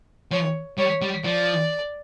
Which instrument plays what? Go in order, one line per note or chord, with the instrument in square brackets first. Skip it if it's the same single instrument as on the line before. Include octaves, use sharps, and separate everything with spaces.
[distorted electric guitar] F3 [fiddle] C#5
[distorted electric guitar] G3 [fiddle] C#5
[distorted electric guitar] G3
[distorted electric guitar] F3 [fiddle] D5